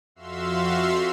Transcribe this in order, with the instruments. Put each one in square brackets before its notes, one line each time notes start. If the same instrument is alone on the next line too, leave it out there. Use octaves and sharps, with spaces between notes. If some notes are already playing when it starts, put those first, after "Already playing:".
[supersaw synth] F2 F#4 E5 F5 C6 E6